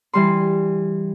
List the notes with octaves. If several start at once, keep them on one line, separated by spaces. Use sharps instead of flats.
E3 G3 C6